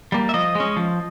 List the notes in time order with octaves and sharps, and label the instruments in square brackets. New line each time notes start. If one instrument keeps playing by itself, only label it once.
[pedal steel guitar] G3 A#3
E5
F3 D#5
G#3 C#4
F3